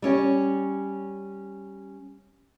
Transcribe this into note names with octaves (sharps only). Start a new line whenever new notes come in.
G3 C#4 C#5